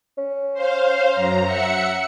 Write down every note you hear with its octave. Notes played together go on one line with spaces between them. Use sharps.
C#4
C5 F5
F#2 A#5
E5 F#5 C#7